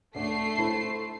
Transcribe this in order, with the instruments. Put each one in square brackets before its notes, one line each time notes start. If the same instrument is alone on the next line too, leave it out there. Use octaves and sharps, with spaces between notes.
[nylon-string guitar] D2 D4 [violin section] A3 C7
[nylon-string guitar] E4 C5